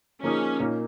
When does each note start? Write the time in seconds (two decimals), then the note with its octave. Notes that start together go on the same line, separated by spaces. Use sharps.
0.23 F3 A#3 C#4 D#4 G#4
0.60 A#2 A#3 D#4 A#4